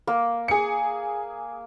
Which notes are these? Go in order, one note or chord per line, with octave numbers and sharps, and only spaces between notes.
A#3
G#4 C#7